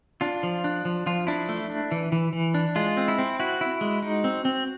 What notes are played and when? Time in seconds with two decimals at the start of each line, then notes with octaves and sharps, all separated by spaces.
0.21 D4 F4
0.43 F3
0.64 D4
0.85 F3
1.06 F3 F4
1.27 D4 E4
1.49 A3
1.70 D4
1.91 E3
2.12 E3
2.33 E3
2.54 D4
2.76 G#3 F4
2.97 C4
3.08 E4
3.19 C4
3.40 E4 F#4
3.61 E4
3.81 G#3
4.02 D#4
4.24 C4
4.45 C4